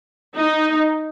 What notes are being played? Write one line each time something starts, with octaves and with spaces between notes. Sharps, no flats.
D#4